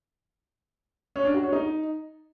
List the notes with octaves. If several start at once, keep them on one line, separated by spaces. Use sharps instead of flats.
C#4
D4
F#4
C#4
D#4